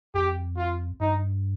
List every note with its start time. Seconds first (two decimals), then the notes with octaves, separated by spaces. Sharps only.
0.14 F2 G4
0.57 F4
1.00 G2 D#4